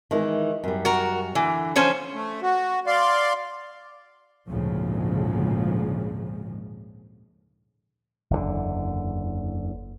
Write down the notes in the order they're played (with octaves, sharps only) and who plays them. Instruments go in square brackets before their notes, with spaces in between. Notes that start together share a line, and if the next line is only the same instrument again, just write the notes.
[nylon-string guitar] D#3 E3 G#3
F#2 G3
[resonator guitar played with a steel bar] F#4 A#4
[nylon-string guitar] D3 [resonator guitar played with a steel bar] E3
[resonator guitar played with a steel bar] F3 C#4 C5
[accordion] A3
F#4
D5 F5 C6
[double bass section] G#1 D2 A#2 C#3 F3 G#3
[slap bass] F#1 E2 G2 D3